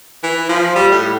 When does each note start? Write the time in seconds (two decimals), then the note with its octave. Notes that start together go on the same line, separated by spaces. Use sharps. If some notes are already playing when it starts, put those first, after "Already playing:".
0.23 E3
0.49 F3
0.76 G3
0.92 A2